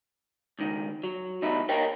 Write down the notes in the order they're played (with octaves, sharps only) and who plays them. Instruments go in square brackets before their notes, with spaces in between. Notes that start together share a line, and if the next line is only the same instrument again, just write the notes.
[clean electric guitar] C#2 D#3
F#3
E2 A2 D#4 E4
A#4 C#5 D#5 G5